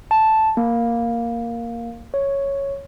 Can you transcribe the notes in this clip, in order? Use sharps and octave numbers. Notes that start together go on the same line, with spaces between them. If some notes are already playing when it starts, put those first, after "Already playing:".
A5
A#3
C#5